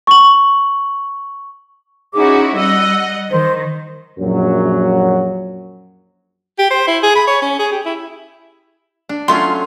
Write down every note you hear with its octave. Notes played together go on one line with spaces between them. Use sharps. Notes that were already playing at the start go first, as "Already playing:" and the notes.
C#6 F#7
C#4 D#4 E4 F#4 G#4 D6
G3 D#5 F#5 E6
D#3 C5
A#1 F#2 F#3
G4
C5
E4
G#4
B5
C#5
C#4
G#4
G4
E4
D4
F#3 A3 C#4 F4 C6